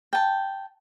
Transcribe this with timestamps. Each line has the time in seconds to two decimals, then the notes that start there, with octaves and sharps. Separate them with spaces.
0.13 G5 A5